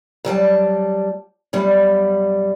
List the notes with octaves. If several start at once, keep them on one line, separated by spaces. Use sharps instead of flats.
F#3 G3 G5 A5
F#2 B2 G3